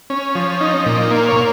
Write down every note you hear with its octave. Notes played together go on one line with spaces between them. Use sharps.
C#4
F3
D#4
A#2
A#3
C#5 F5
A#2